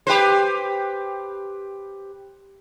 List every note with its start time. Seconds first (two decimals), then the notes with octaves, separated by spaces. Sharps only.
0.07 G4 B4 C5